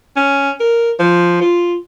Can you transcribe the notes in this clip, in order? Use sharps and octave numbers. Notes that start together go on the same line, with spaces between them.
C#4
A#4
F3
F4